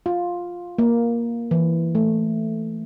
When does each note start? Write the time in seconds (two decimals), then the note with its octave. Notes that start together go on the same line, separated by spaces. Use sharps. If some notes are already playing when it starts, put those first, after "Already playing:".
0.06 F4
0.78 A#3
1.51 E3
1.95 A3